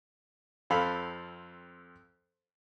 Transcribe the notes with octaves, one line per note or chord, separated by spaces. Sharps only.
F2 C4 A4 F5 B5